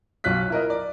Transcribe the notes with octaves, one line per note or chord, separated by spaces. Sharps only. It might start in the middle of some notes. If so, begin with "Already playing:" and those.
B1 F4 C#5 F#6 B6
E4 A#4 D#5
D5